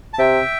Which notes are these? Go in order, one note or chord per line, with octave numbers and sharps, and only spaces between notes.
A5
C3 E5 G5